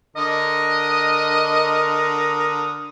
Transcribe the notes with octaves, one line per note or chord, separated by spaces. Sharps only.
D3 A#4 D#5 D#6